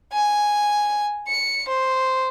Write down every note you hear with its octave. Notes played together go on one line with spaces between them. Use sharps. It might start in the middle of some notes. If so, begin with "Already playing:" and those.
G#5
C#7
C5